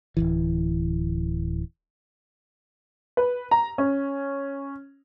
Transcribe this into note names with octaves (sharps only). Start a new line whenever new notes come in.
D1 C#2 E3
B4
A#5
C#4